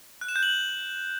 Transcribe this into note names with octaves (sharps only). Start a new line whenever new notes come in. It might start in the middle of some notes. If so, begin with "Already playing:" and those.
F#6
E7
G6
F#7